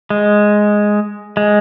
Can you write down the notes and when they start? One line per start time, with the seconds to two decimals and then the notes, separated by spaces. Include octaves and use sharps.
0.10 G#3
1.37 G#3